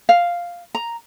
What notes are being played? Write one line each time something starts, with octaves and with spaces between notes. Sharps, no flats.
F5
A#5